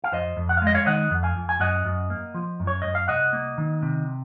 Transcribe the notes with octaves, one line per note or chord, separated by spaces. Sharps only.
F5
F2 C5 D#5
F2
F#5
F5
G#3 D#5
C#5 F5
D#3 D#5 F#5
F2
F5 G#5
F2
G#5
F#2 D#5 F#5
F#2
A#3
F3
F#2
C#5
F#2 D#5
F5
C2 D#5 F#5
A#3
D#3
C3